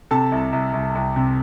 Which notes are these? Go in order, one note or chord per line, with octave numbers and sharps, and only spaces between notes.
C3 A4 A5
C2
C2
C2
C2
C3